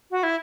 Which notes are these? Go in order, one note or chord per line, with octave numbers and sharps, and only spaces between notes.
F#4
E4